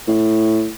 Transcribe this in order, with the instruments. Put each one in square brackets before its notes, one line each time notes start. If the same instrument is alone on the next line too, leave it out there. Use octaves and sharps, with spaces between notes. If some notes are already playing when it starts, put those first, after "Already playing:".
[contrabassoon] A2